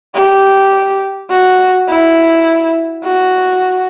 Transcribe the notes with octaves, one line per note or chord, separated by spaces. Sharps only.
G4
F#4
E4
F#4